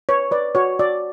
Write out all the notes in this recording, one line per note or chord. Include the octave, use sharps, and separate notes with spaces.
B4 C#5
B4 D5
F#4 C#5
F#4 D5